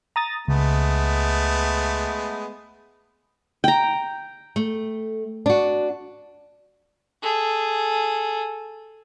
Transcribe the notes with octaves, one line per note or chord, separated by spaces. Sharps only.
A#5 D#6 A6
C#2 G#3 A3 B3
G5 A#5
A3
D4 F#4
G#4 A4